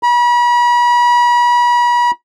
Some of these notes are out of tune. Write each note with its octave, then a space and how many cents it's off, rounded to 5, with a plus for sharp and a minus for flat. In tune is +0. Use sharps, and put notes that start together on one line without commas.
B5 -40